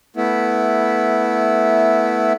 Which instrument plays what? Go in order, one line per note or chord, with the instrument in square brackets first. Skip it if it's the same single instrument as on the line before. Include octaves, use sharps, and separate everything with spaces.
[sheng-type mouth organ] A3 B3 E4